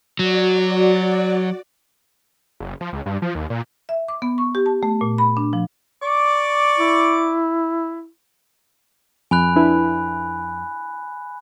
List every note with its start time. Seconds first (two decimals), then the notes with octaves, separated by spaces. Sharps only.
0.19 F#3 F#4 D5
2.60 F#1
2.81 F3
2.93 C#2
3.06 G2
3.22 F3
3.35 D#2
3.50 A#2
3.89 E5
4.08 D6
4.22 B3
4.38 C#6
4.55 G4
4.66 A5
4.83 A3
5.01 A#2
5.18 B5
5.37 D4
5.53 F3
6.02 D5 C#6 D6
6.79 E4
9.31 F2 G#5 B5 F#6
9.56 D4 E4 B4